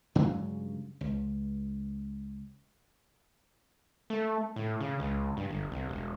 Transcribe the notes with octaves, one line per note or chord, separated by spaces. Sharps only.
G2 C#3 F#3 G#3
C#2
A3
A2
C#3
C#2
G2
G1
C2
E1